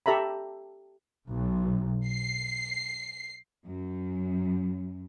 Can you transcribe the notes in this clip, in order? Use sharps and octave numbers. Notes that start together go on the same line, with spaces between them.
G4 A4 E5 A#5 B5
B1
C7
F#2